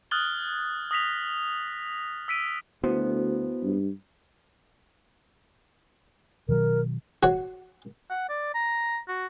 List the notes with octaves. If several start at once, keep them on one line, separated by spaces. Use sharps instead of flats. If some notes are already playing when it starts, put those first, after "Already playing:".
D#6 F6 F#6 G#6 A6 G7
D#6 A#6 B6 F7
E6 B6 D7 D#7
D2 B3 E4 F#4 C5
G2
B2 D#3 F#3 A#4
F#4 C#5
F#5
D5
A#5
F#4